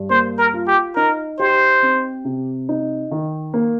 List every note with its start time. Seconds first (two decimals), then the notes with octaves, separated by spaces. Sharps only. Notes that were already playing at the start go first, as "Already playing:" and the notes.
Already playing: G2
0.10 A#3 C5
0.38 A#4
0.54 F4
0.68 G4
0.96 D#4 A#4
1.39 G4 C5
1.83 C4
2.25 C3
2.69 D#4
3.11 D#3
3.54 A#3